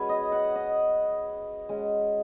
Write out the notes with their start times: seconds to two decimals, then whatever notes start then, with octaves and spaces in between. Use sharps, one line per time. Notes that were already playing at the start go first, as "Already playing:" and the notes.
Already playing: G#3 C#4 F#4 G#4 B4 C#5
0.09 D#5
0.32 F#5
0.55 D#5
1.69 G#3 C#4